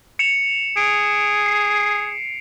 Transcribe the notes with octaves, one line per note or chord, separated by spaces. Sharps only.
C#7 E7 F7
G#4 D7
C7